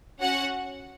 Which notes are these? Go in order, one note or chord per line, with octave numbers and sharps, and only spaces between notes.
C#4 F#4 F#5